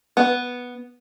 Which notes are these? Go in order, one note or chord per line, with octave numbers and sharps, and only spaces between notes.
B3